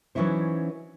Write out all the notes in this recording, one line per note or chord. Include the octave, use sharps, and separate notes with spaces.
E3 F#3 C#4 D#4 E4 C5